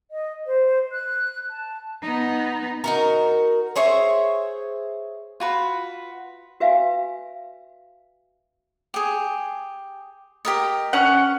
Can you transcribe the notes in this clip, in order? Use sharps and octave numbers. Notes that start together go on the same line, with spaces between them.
D#5
C5
F#6
A5
B3 D#4
D#4 F#4 A#4
G#4 C5 C#5 E5
F4 F#4 B4
F#4 B4 E5 F5 G#5
G4 G#4
G4 A#4 D#5
C#4 F#5